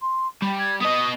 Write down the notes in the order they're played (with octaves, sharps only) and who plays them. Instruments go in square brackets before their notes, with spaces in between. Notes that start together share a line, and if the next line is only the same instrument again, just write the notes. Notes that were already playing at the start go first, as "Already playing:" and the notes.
[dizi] C6
[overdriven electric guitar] G3 [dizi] B5
[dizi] G#6
[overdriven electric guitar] B3 D#5 [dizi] D#6